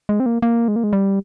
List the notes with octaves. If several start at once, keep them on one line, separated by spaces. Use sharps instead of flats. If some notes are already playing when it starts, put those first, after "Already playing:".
G#3
C4
A#3
A#3
G#3
A#3
G#3
G3